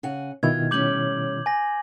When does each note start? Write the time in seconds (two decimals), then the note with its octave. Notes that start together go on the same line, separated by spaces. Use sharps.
0.03 C#3 F#5 G#5
0.43 B2 D#3 E4 F4 G#6
0.71 A2 G3 C#4 D6 G6 F#7
1.46 G#5 A#6